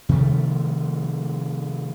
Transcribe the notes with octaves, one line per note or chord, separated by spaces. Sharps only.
C3 D#3 F3 A3